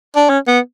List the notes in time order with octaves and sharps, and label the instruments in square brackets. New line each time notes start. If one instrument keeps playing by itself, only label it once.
[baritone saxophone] D4
C#4
B3